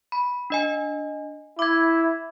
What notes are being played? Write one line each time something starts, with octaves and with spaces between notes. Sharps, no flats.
B5
D4 D#5 G#5
E4 D6 G#6